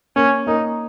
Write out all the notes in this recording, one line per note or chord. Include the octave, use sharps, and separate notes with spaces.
A#3 C#4
A#3 D#4